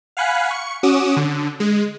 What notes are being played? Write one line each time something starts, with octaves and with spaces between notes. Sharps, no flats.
F5 F#5 G#5 B5 F#6
C#6 C#7
C#4 F#4 D6 D#6 E7
D3
G#3